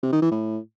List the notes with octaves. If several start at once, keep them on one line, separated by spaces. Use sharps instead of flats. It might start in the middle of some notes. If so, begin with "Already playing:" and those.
C3
D#3
E3
A2